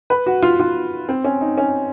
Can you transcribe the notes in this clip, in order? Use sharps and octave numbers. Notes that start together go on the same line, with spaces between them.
B4
F#4
F4
F4
C4
C#4
D#4
C#4